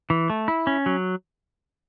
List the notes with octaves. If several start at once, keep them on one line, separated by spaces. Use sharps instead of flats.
E3
A3
E4
C#4
F#3